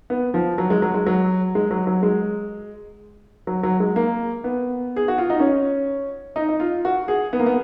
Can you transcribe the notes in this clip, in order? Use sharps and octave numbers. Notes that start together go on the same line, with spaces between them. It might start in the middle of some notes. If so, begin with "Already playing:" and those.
B3
F3
F#3
G#3
F#3
G#3
F#3
G#3
F#3
F#3
G#3
F#3
F#3
G#3
A#3
B3
G#4
F#4
F4
D#4
C#4
D#4
D#4
F4
F#4
G#4
B3
A#3
B3